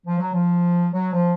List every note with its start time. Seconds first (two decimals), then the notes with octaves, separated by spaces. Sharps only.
0.06 F3
0.19 F#3
0.33 F3
0.92 F#3
1.13 F3